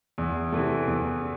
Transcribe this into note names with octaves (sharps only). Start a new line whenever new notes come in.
E2
C3 E3 A3
E2